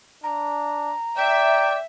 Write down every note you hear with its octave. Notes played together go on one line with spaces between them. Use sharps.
D4 A#5
D5 E5 G5